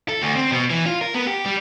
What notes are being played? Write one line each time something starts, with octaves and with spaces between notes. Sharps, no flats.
A4
D2
C4
B2
E3
F4
A#4
B3
G4
G3